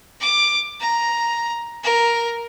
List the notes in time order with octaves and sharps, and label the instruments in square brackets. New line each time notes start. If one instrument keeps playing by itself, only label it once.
[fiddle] D6
A#5
A#4